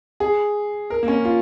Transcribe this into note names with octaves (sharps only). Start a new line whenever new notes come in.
G#4
A#4
A#3
C#4
F4